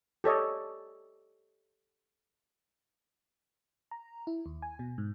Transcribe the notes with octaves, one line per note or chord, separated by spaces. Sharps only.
G4 A4 C#5 D#5
A#5
E4
D#2
G#5
B2
G#2